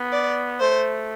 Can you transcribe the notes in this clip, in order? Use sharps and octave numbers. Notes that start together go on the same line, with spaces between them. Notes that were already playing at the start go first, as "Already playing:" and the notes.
Already playing: B3
D5
A3 C5